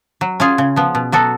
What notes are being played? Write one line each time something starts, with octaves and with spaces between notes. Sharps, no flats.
F#3
C#4 F4 G#4
C#3
F3 B3
B2
F#3 B3 F#4 A4